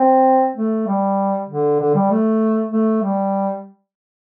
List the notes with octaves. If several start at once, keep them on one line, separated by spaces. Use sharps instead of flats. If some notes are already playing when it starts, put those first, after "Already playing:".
Already playing: C4
A3
G3
D3
D3
G3
A3
A3
G3